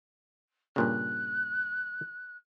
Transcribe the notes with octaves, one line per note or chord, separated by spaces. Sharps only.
G2 A#2 C#3 F#6